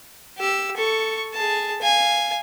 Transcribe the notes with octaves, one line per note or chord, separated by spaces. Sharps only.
G4 E6
A4 C#6
G#4 A5
F5 G#5